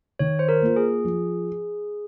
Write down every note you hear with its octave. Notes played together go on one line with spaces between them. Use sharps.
D#3 C#5
C5
A#4
A#3 F4
G#4
F3